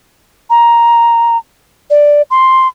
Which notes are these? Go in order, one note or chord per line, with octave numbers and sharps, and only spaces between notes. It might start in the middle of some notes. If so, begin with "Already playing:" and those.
A#5
D5
C6